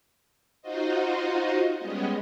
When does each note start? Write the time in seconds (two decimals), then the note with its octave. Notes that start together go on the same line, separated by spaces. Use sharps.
0.62 D#4 F4 F#4 C5 D#5
1.79 G3 G#3 B3 C#4 D#5